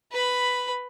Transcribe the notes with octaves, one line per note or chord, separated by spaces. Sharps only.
B4 B5